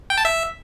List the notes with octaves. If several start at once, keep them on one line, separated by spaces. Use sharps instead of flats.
G5
A5
E5